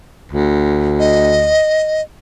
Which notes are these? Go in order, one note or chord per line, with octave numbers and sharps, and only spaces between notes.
D2
D#5